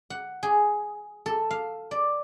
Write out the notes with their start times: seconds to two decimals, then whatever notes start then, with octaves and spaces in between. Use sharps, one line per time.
0.10 F#5
0.43 G#4
1.26 A4
1.51 F5
1.91 D5